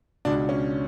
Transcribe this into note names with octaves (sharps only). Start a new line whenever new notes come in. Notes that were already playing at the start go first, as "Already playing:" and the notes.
C#2 B2 D4
C#4